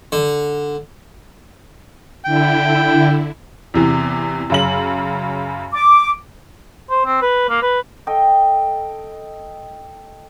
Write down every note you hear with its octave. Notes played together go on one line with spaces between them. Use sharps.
D3
D3 E4 G5
E2 C3 E3
F#2 C#3 F#7
D6
C5
C4
B4
A#3
B4
A4 D#5 G5